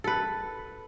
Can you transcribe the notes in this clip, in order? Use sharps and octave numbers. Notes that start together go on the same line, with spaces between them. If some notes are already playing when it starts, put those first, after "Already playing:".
A4 B4